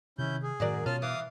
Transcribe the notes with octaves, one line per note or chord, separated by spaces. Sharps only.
C3 D#3 C#4 E4 G6
G#4
F#2 A2 D#3 A#4 D5
B2 C#4 F4 A5 F6
E3 F5 D6 D#6